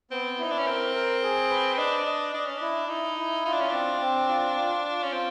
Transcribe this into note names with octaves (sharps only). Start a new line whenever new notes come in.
B3 C4
D#4 E4
D4
C#4
C4 A#4
A#4
G#4
B4
D4 D#5
D#5
D4 D#5
C#4
D4 E4
D#4 E4
E4
D#4 F4
D4
C#4
C4 D4
C4
F4
F4
F4
C#4
C4 F4